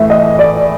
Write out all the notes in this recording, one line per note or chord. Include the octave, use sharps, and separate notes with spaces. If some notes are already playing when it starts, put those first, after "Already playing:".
Already playing: A2 E3 A3 E5
D#5
D5